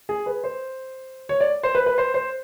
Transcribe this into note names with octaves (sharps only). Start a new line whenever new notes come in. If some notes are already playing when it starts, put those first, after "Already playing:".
G#4
B4
C5
C#5
D5
C5
B4
B4
C5
C5